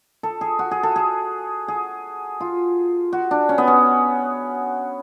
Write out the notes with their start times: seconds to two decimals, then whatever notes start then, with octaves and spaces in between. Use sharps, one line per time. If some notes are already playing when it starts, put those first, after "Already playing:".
0.23 A4
0.41 G#4
0.59 F#4
0.71 G#4
0.83 A4
0.96 G#4
1.68 G#4
2.41 F4
3.13 F#4
3.31 D4
3.49 C#4
3.58 B3
3.68 C#4